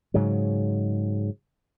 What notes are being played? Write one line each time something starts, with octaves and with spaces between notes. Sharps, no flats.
G#2 C#3 F#3